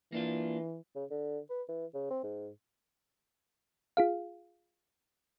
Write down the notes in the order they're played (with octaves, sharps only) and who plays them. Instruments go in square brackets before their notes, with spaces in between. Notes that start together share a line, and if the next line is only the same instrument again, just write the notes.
[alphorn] E3 [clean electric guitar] A#3 D4 F4
[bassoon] C#3
D3
B4
E3
C#3
C4
G#2
[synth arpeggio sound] F4 G#4 F5